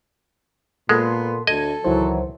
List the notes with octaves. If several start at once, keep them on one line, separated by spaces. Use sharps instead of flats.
A#2 G#3 B3 A4 C6
D2 A4 D#5 G#6
C#2 D#3 E3 F#3 E4 C5